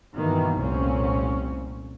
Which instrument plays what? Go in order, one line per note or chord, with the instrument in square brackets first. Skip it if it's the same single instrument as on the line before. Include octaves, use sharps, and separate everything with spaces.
[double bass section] G2 B2 D#3 E3 A#3
F1 C2 A#2 C4 C#4